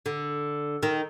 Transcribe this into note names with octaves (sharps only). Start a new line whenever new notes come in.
D3
D#3